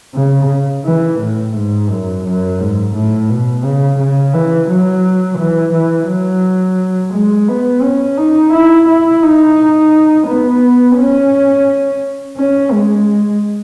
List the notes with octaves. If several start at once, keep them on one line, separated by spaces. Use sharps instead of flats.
C#3
E3
A2
G#2
F#2
F#2
G#2
A2
B2
C#3
C#3
E3
F#3
E3
E3
F#3
G#3
B3
C#4
D#4
E4
E4
D#4
B3
C#4
C#4
G#3